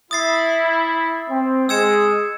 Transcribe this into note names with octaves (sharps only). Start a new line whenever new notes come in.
E4 D#6 A6 C7
C4
G#3 E6 G#6 C#7 E7